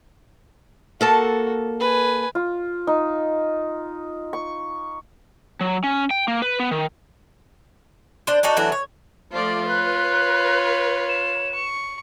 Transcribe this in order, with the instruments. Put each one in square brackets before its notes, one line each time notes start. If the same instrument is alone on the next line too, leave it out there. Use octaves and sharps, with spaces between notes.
[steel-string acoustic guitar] A#3 A4 A5 [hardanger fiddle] F#4
[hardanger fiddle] B4 G#5
[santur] F4
D#4
C#6
[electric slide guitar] F#3
C#4
G5
A#3
B4
B3
D#3
[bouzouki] D4 C5
D4 D#4 F#4 A4
E3 F#3 A3 D4
C#5
[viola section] F3 A3 D5 [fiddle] F4
[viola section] B4 [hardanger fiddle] C#5 [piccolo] F#6
[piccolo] E7
[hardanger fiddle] C#6